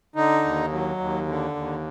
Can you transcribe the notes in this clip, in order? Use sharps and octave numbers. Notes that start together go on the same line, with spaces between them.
D3 D#4
D#2
F#3
D#2
D3
D#2